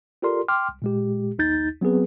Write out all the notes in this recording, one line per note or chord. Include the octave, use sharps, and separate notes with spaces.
F4 G4 A4 A#4 D5 C6
G5 C6 D6 F6
C2
A#2 G#3 G4
A#1 D#2 D#4 G6 A6
F#3 B3 C4 G#4 B4